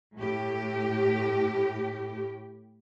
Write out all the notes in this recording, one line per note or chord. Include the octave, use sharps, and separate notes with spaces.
A2 G4